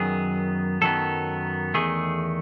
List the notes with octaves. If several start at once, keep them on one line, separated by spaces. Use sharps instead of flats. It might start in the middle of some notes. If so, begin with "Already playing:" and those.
Already playing: F#2 D#3 F#3 B3 G#4
F#2 D#3 F#3 B3 A4
E2 D#3 A3 G#4